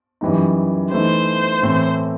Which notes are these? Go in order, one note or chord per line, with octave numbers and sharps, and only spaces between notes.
F#2 E3 G3 D#4
E3 A3 D#4 C5
A2 E3 A3 C4